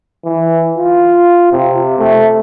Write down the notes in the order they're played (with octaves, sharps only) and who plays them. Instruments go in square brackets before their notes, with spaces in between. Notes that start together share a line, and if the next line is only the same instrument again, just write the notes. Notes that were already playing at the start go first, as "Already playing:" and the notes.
[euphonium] E3
F4
C3
A3